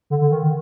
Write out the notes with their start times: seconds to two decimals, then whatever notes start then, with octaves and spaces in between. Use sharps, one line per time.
0.10 D3
0.21 D3
0.31 D#3